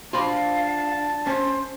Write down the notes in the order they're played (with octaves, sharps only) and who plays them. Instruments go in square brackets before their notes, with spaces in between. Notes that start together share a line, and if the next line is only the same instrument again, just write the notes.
[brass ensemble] D4 A5 [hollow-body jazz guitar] F4 C5 B5 [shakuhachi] F5
[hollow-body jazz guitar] C#4 [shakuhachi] C5